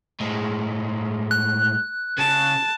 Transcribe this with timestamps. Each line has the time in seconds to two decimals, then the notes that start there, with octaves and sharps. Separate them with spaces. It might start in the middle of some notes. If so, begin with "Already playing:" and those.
0.20 A2 G#3
1.31 F#6
2.18 C#3 A5